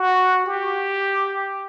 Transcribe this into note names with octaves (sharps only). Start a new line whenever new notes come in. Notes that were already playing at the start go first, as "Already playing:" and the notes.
Already playing: F#4
G4